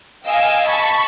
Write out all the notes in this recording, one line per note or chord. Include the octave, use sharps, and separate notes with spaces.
D#5 F5 G5 G#5 E6
A5 B5 C#6 B6